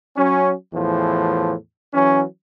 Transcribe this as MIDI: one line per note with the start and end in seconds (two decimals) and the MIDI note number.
0.17 0.53 54
0.17 0.53 61
0.73 1.53 40
0.73 1.53 45
0.73 1.53 52
0.73 1.53 53
1.94 2.23 52
1.94 2.23 54
1.94 2.23 61